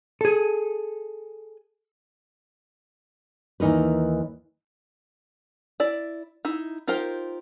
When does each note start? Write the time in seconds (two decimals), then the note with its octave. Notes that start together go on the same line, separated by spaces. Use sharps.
0.21 G#4 A4
3.60 D#2 E3 D#4 A#4 B4
5.80 E4 D5
6.45 D#4 E4
6.88 D#4 F4 G4 A#4 C5